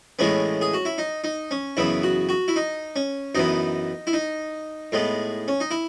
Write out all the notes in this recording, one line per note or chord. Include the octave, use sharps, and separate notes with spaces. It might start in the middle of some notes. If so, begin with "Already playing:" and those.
A2 E3 G#3 B3 C#4
G#4
F#4
E4
D#4
D#4
C#4
F#2 C#3 E3 B3 E4
F#4
F#4
E4
D#4
C#4
F#2 E3 B3 D#4
E4
D#4
A2 G#3 B3
C#4
D#4
E4